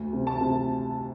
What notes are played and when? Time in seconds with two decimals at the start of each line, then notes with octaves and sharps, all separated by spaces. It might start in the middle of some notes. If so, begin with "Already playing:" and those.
Already playing: D2
0.13 C3
0.27 A5
0.41 C3